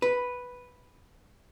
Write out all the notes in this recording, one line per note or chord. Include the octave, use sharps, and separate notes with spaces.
B4